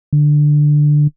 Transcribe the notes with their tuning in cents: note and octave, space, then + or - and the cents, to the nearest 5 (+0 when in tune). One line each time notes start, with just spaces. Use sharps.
D3 +10